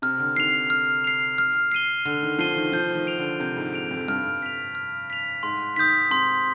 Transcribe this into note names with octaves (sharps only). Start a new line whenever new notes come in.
C3 F6
D3
D#3 C7 F7
F6
C7 F7
F6
C7 D#7 G7
D3 F6
D#3
F3 C7 D#7 G7
D#3
F3 G6
D#3
D7 F7
D3
C3 G6
G#2
D7 F7
F2
G2 F6
B6 F7
F6
B6 F7
G#2 C6
D#3 D#6 G6 B6
C3 C6